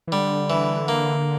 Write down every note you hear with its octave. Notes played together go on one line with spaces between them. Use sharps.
E3
D3 G3
E3
A#3